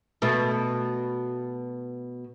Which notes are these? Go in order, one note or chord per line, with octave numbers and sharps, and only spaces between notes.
B2 A3